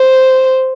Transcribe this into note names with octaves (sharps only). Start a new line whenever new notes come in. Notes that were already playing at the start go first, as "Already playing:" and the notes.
Already playing: C5